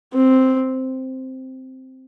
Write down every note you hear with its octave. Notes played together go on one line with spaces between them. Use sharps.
C4